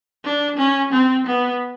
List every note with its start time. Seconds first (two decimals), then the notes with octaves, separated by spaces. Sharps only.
0.24 D4
0.58 C#4
0.92 C4
1.26 B3